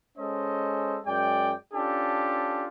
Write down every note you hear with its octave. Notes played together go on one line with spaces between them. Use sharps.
G#3 C#4 A4 C5 D#5
F#2 G#3 D5 G5
C#4 D4 F4 G4 A4